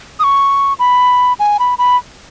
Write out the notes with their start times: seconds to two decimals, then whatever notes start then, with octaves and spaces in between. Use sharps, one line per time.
0.20 D#6
0.24 C#6
0.79 B5
1.39 G#5
1.59 B5
1.79 B5